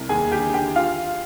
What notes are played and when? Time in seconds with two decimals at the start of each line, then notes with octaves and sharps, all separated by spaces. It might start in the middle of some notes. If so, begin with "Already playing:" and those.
Already playing: C2
0.09 D#2 G#4 G#5
0.31 D3 G4 G5
0.53 D3 G4 G5
0.76 F4 F5